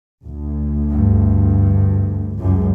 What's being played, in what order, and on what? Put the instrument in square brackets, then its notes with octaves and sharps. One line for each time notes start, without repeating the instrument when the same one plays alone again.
[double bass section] D2
[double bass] G2
[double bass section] C#2 F#2